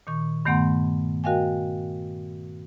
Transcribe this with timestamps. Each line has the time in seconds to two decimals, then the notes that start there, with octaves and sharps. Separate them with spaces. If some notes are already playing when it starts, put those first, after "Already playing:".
0.07 A#2 D#3 C#6
0.45 G2 D#3 A3 B3 F#5 C6
1.24 F#4 A#4 D#5 F5 G5 G#5